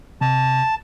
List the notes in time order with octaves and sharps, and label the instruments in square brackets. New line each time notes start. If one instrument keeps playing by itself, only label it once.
[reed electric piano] C3 [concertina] A5